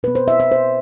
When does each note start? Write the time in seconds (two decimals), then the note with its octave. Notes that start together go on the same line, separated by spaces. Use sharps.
0.03 B2 B4
0.08 B3
0.15 C5
0.28 E5
0.40 E5
0.52 C5